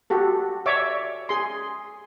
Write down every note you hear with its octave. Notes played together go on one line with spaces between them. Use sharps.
F#4 G4 A4
C#5 D5 E5 D6
G#4 C6